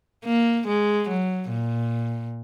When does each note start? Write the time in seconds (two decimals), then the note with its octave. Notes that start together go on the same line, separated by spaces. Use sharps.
0.25 A#3
0.67 G#3
1.08 F#3
1.50 A#2